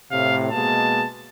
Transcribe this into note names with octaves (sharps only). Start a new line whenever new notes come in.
A2 C3 F5
B2 G#3 A#3 A5